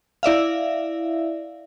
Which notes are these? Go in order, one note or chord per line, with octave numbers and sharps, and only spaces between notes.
E4 D5 E5 F5